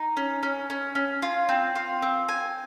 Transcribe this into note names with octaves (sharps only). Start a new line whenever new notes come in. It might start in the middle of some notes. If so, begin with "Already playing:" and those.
Already playing: D#4
C#4
C#4
C#4
C#4
F4
C4
F4
C4
G#5